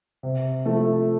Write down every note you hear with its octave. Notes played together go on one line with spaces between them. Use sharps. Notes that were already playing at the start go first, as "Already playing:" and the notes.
C3
F3 A3 F4 A4